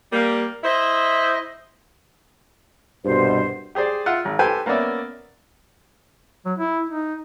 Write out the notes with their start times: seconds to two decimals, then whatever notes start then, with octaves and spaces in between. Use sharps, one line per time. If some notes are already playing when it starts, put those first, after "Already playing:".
0.12 G3 A#3
0.64 E4 C5 D#5 E5
3.05 C2 G2 B2 C5
3.75 G4 G#4 C5 D5
4.06 F4 E5 F#5
4.25 G#1
4.39 G4 A4 B4 C5 G5 G#5
4.66 A#3 B3 C#4 D5 E5
6.45 F#3
6.58 E4
6.89 D#4